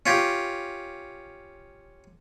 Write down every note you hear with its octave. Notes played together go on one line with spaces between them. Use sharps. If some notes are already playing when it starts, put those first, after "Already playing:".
C#4 F4 G4